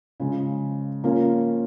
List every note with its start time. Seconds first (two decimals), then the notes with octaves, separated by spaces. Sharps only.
0.20 C#3 F3 G#3
1.04 F3 A#3 C#4 F4